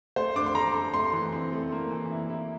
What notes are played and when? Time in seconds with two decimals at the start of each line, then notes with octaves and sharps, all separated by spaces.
0.16 A3 C5
0.35 D4 D6
0.46 C6
0.54 A4 A#5
0.74 A4
0.94 A3 C6
1.13 E3
1.32 C4
1.52 A3
1.72 A#3
1.91 E3
2.11 E4
2.30 E4